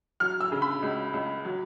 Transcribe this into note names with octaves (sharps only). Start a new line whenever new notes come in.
F#3 F6
E6
C#3
B5
C#2
C#2
F#3